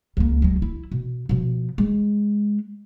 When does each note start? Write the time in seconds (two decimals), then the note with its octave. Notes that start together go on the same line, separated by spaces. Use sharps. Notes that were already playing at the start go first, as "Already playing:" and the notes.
0.17 C#2 A#3
0.42 F#3 G#3
0.62 E4
0.91 B2
1.29 B2 F3
1.78 G#3